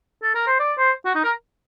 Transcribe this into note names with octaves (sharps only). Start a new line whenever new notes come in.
A4
A#4
C5
D5
C5
F#4
D#4
A#4